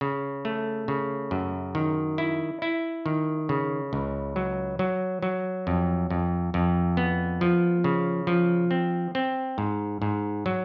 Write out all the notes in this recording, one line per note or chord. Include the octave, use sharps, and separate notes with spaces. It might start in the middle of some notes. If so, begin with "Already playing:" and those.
C#3
A3
C#3
F#2
D#3
E4
E4
D#3
C#3
C#2
F#3
F#3
F#3
F2
F2
F2
B3
F3
C#3
F3
C4
C4
G#2
G#2
F#3